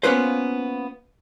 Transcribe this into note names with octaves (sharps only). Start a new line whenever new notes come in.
A#3 B3 C#4 F4 B4 C5